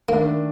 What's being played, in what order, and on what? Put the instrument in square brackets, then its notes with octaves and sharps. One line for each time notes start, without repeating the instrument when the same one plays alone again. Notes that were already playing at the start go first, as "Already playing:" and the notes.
[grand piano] D#3 A3 D4 [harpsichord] A#3